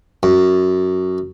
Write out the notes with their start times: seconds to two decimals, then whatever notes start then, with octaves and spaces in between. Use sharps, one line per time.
0.23 F#2